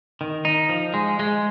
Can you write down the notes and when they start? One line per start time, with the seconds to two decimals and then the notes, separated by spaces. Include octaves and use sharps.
0.21 D#3
0.45 D#4
0.69 F3
0.94 G#3
1.19 G#3